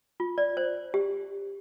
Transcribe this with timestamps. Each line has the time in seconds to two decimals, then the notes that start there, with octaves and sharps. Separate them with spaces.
0.20 F4
0.38 D5
0.57 C5
0.94 G4